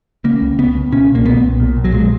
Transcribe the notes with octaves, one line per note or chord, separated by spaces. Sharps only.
C#3 A#3
C#2
C#3 B3
C#2
A#2 C#4
B1
A#3
A#2 B3
B1
A#2
B1
F#3
A#2 G#3